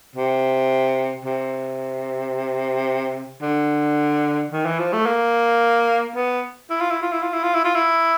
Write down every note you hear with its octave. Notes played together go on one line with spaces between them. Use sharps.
C3
C3
D3
D#3
E3
F3
A3
A#3
B3
E4
F4
E4
F4
E4
F4
E4
F4
E4
F4
E4